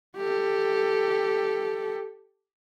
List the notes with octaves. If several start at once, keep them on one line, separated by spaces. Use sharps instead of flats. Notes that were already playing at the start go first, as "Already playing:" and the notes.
G4 A4